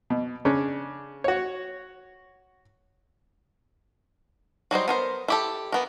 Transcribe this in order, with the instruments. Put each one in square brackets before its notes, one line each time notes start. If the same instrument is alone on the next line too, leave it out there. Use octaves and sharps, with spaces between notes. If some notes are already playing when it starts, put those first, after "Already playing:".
[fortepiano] B2
C#3 C#4 D4
F#4 C#5
[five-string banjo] F#3 G3 D#4 C5
B3 A#4 C5
E4 G4 A4
E3 B3 A#4